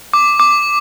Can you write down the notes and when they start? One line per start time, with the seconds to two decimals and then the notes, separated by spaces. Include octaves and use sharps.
0.13 D6
0.40 D6